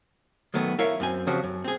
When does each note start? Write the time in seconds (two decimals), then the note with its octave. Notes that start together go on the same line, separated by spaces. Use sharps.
0.54 D#3 F#3 A3 B3
0.79 E4 F#4 A#4 C#5 E5 F5
1.00 F#2 C4 G#5
1.27 C#3 F3 C4 F#4 G4
1.43 F#2
1.64 C4 G#4